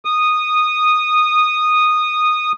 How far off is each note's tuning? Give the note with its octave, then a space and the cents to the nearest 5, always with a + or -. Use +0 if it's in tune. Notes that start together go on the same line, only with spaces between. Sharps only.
D#6 -10